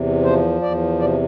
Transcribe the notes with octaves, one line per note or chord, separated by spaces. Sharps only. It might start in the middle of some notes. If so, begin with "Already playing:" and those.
Already playing: E2 C3
F3 C5
E2 D5
C3 D5